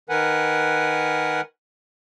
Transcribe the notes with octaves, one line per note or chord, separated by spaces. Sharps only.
D#3 A#4 B4 F#5 G#5